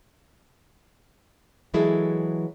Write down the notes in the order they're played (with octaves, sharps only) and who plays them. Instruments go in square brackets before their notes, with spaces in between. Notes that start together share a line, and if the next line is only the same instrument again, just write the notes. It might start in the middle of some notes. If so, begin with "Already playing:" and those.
[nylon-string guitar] E3 F#3 G#3 E4 G#4 A4